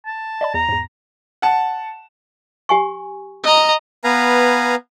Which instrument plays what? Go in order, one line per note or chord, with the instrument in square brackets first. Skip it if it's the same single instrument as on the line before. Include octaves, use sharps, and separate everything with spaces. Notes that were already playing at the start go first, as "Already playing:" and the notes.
[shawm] A5
[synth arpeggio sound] D5 D#5 B5
[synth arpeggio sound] E2 [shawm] A#5
[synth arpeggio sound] E2 G#2
[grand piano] F#5 A5
[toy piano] G4 G#5 C#6
[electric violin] D#5 A#5
[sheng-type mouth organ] B3 B4 F5 G#5 A#5